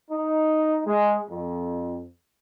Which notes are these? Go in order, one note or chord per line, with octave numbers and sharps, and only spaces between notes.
D#4
G#3
F2